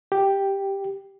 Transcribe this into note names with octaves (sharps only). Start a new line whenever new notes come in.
G4